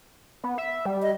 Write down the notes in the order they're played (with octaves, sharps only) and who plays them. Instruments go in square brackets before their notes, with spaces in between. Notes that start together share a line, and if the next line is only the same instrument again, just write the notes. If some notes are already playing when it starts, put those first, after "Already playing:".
[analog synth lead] B3
E5
G3
[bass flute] D#5